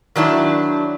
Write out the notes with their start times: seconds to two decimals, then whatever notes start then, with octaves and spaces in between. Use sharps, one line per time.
0.16 D#3 F#3 D4 E4